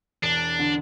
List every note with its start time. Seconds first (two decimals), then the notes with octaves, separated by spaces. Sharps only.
0.23 E1 D4
0.59 D3